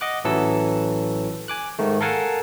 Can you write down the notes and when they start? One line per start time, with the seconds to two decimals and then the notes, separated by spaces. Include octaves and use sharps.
0.01 D#5 F#5 D6 F#6
0.24 A1 E3 F#3 A4 B4 E6
1.48 G#5 D6 F#6
1.79 G#2 D#3 A3
2.01 A4 A#4 F5 F#5 G#5 A5